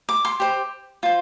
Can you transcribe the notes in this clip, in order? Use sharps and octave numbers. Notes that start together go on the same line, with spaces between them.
D6
C6
G4 C5
F4 C5